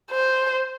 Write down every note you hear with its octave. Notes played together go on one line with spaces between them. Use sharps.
C5